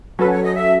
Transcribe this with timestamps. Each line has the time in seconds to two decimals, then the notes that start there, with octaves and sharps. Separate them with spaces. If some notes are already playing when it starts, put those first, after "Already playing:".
0.18 F#3 C#4 F#4 A4 B4
0.31 C#5
0.43 D#5
0.55 E5